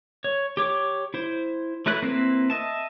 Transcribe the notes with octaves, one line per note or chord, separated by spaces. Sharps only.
C#5
G4 C#5 D6
E4 C5
F#3 A3 E4 B4 F#6
A#3 C4 E4 B4
D#5 E5 A5